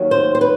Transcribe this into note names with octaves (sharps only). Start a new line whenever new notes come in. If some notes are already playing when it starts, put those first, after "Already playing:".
Already playing: D#2 D#3 F#3
C5
C5
B4